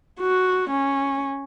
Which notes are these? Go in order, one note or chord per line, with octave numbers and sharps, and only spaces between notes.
F#4
C#4